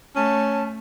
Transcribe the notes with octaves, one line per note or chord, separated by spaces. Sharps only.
A3 C#4 A5